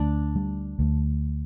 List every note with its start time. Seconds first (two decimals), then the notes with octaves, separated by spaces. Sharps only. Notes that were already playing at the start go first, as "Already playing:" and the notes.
Already playing: D2 D4
0.35 G3
0.79 D2